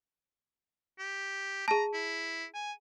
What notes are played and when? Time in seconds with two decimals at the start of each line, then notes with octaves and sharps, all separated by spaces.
0.99 G4
1.68 G#4 A5 A#5
1.93 E4
2.54 G#5